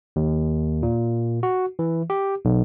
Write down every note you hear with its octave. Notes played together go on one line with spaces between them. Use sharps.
D#2
A#2
F#4
E3
G4
B1